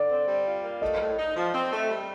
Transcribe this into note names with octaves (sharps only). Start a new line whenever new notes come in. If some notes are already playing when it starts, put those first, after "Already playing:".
Already playing: D3 D5
C4
G3
F4
A#3
A3 D#5
A2
D#4
F3
C4
A3
G3